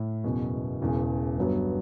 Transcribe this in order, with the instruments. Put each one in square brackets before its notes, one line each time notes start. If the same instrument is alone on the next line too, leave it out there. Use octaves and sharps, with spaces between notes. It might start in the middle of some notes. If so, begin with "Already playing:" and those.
Already playing: [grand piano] A2
F#1 E2 B2
E1 E2 C#3 E3
G1 G2 F#3 B3